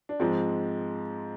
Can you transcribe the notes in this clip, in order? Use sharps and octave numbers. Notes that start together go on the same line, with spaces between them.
D4
G#2 F3 G#3 C4